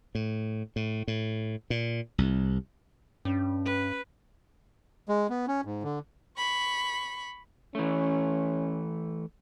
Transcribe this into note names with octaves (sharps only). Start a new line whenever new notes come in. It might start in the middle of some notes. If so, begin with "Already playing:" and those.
A2
A2
A2
A#2
C2
G2 C#4
B4
G#3
B3
C#4
G#2
D3
B5 C#6
E3 A3 C#4